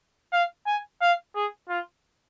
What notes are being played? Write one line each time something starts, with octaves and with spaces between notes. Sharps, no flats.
F5
G#5
F5
G#4
F4